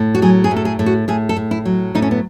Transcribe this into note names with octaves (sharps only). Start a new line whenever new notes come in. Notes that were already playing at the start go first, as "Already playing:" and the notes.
Already playing: A2
F#4
F#3 G#4
G#4
A2
A4
G#4
A2
F#4
A2 G#4
A4
A2
E4
F#3
A2 D#4
C#4
B3